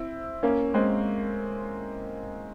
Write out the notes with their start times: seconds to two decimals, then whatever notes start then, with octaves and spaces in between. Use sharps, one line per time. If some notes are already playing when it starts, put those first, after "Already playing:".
Already playing: C4 E4
0.43 A#3 C#4
0.74 G#3 C4